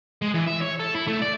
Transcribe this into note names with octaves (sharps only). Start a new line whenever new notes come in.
G#3
E3
E5
C#5
A4
E4
A3
D5